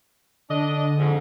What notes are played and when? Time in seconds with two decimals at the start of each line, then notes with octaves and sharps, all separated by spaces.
0.50 D3 D4 D#5
0.77 D3
0.99 F2 G#2